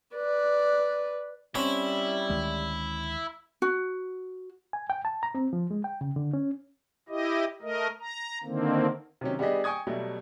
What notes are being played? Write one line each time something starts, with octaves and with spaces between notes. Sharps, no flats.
B4 D5
G3 C4 C#4 E4
D2 D#3 G#3
F#4
G#5
G5
A5
A#5
C4
F3
G#3
G5
C#3
D3
C#4
E4 G4 D#5
A3 A#4 D#5
A#5
D3 D#3 A#3 C4
C3 D#3 F#3 C#4
G3 B3 D4 G4 G#4 D#5
G5 G#5 C#6 D#6 G#6
B2 F#3 G3 A3